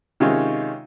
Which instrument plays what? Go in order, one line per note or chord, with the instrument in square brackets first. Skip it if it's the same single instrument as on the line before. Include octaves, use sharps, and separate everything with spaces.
[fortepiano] C3 D#3 G#3 C#4 D#4 F4